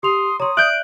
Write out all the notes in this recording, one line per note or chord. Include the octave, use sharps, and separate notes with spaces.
G4 C6 D#6 F7
C#5 A#5 C6 D#6
D5 E5 F#6 G6 D7